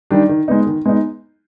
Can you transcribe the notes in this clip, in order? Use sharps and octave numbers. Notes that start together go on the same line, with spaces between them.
D#3 G3 D4
D#3
G#3 B3 D#4
D#3
G#3 B3 D#4